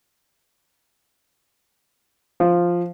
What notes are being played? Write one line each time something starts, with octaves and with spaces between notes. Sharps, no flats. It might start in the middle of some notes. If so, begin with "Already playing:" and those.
F3